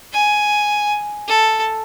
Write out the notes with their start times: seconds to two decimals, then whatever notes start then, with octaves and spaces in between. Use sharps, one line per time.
0.13 G#5
1.28 A4